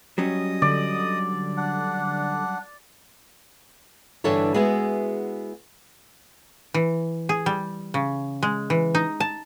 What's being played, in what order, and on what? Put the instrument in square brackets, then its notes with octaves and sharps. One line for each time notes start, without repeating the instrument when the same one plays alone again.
[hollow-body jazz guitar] F#3 G3 C#4 [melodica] D#5 D#6
[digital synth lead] D3 [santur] D5
[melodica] D4 F#5
[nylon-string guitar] G2 D3 E3 D4 A4 C#5
G#3 B3 E4 F#4 G#4
[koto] E3
G#4
G3
C#3
G#3
E3
D#4
A5